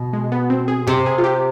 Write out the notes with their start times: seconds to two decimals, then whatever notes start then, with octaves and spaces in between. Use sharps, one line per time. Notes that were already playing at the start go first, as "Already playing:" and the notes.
Already playing: B2
0.13 G#3
0.32 B3
0.50 C4
0.68 G#4
0.87 C3 G4
1.06 G#4
1.18 F4
1.24 G4